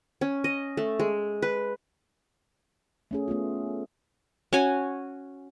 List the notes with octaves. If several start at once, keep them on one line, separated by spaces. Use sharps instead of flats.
C#4
D#5
A3
G#3
B4
A3 C#4 G#4
A3 B3 F4
C#4 F#4 C#5 G#5